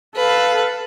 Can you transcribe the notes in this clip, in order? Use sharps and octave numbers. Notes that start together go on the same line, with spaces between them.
A4 B4 F5